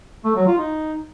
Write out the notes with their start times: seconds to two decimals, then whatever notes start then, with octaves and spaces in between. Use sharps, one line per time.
0.25 A3
0.36 F#3
0.47 F4
0.58 D#4